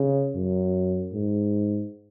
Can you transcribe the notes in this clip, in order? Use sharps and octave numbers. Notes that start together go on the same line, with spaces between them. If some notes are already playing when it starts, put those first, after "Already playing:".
Already playing: C#3
F#2
G#2